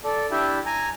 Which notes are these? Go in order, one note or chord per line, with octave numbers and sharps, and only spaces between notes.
A4 D5
D4 E4 G4 E5
G#5 A#5